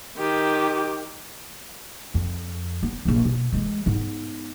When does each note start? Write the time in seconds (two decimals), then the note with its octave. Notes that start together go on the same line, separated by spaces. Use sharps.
0.17 D#3 G4
2.14 F2
2.83 B3
3.05 A#1 A#3
3.25 B2
3.53 E3 G#3
3.86 G#2 B3